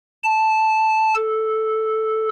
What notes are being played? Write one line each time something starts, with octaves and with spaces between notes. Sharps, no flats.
A5
A4